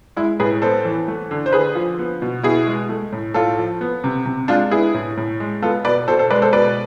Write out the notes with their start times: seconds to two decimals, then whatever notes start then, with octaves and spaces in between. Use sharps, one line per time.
0.16 G#3 E4
0.40 A2 G#4 B4
0.62 B3 A4 C5
0.85 E3
1.08 A3
1.31 D3
1.46 C5
1.52 D3 G#4 B4
1.75 F3
1.99 B3
2.22 B2
2.43 B2 E4 G#4
2.67 G#3
2.89 A3
3.12 A2
3.34 A2 F4 A4
3.58 F3
3.81 B3
4.04 C3
4.26 C3
4.48 G#3 D4 F4
4.71 B3 E4 G#4
4.94 A2
5.17 A2
5.40 G#3
5.62 B3 F4 A4
5.85 B2 B4 D5
6.08 B2 A4 C5
6.19 A4 C5
6.31 G#3 B4 D5
6.42 A4 C5
6.53 B2 B4 D5